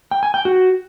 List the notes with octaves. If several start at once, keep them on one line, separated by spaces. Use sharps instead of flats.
G5
G#5
G5
F#4